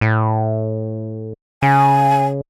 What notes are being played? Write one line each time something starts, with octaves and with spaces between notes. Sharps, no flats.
A2
C#3 G#5